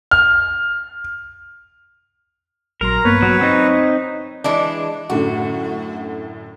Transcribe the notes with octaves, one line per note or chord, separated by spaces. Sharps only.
F6
A#1 F#3 A#4 A#5 C6
G2 A#3 B3 B4 C#5
F#3 A#5
C4 D#4
E3 G#3 D4
F#2 A2 D3 F#4